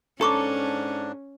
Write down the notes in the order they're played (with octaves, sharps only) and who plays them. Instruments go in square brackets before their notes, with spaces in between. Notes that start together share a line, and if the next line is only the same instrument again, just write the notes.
[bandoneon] G#2 D4 [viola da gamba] C#4 [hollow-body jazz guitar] A4 [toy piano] A#5 C#6 D6